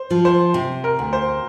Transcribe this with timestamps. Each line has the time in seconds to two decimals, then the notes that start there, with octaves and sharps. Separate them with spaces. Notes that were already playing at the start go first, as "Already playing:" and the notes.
Already playing: C5
0.11 F3
0.25 C5
0.54 C3
0.84 A#4
0.99 D2
1.13 C5